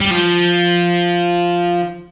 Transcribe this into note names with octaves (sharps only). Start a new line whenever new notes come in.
G3
F3